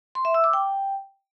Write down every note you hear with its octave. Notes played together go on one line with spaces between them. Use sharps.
C6
E5
E6
D6
G5